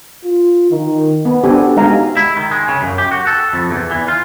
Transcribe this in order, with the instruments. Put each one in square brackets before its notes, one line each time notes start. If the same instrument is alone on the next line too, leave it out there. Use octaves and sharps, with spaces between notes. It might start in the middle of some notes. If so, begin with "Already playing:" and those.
[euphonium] F4
D#3
[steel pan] B3
B3 D4 G4 A4 C5 G#5
F#4
G#3 D#4 G4 F5 G#5 A#5
[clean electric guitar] E4
D#3
G#3
C#3
F#2
G4
F#4
A4
F2
E2
E3
F4